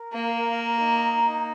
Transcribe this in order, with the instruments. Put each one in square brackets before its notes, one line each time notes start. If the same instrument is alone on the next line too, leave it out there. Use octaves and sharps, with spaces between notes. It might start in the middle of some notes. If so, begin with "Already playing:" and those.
Already playing: [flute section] A#4
[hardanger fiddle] A#3 [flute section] F5
[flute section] A#4
A#5
D#4
A#5
D#4